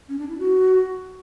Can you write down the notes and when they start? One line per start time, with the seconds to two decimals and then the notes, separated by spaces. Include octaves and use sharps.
0.09 C#4
0.19 D4
0.29 E4
0.39 F#4